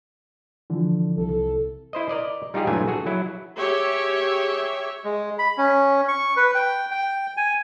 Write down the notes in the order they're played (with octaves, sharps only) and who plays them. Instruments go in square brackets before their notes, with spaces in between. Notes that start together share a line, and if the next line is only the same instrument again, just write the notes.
[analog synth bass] D3 [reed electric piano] E3 F3
[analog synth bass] C2 [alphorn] A4
[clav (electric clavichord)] E4 C5 D#5
A#4 D5 D#5
G3 D#4 F4 G4 G#4
G2 A#2 E3 F#3 A3 G#5
F#4 G#4 A4
F#3 E4
[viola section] G4 G#4 C#5 E5
[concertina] G#3
B5
C#4
C#6
B4
G5
G5
G#5